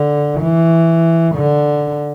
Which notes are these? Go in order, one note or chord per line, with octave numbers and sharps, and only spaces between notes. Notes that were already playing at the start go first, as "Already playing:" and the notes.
Already playing: D3
E3
D3